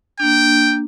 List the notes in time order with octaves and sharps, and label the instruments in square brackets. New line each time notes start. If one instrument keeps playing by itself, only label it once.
[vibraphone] A#3 D4 [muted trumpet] G5